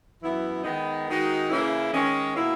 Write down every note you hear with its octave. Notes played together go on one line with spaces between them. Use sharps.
F#2 E3 B3 E4
D#3 G#3 B3 D#4
D#3 G#3 D#4 F#4
C#3 E3 A#3 C#4 E4
D#3 G#3 C#4
B2 A#3 E4